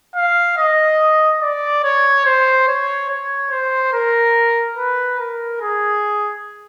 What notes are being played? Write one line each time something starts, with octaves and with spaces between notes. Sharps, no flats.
F5
D#5
D5
C#5
C5
C#5
C#5
C5
A#4
B4
A#4
G#4